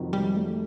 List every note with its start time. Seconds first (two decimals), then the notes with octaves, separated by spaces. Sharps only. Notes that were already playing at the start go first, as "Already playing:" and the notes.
Already playing: F2 C3 D#3 F#3
0.13 G3
0.37 A3